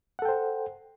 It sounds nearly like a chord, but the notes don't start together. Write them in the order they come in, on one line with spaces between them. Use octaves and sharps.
F#5 A4 G5 C5